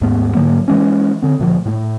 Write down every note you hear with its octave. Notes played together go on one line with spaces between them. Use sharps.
D#2 G#2 A3 B3
G#2 D3 F#3 A#3
E3 G#3 C#4
D3 C4
D2 A#2 F3
A2 A3